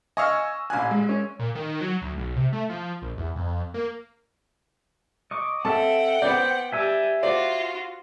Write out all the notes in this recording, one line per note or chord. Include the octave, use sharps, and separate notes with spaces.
D#5 F5 G#5 C#6 E6 F6
A1 A#2 G#5 F#6
G#3
C#4
A#2
D#3
F#3
D2
B1
C3
A3
F3
A#1
E2
F2
A#3
D#5 C#6 D6
C4 A4 E5 F#5 G5 A5
B3 C5 D5
G3 E5 G#5 E6
F4 F#4 C5 D5